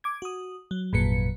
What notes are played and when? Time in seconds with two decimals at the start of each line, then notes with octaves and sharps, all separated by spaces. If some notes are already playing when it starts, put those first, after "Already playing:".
0.04 D6 G#6
0.22 F#4 D#6
0.71 F#3
0.93 G#1 F2 A#2 F#3 B4 C#7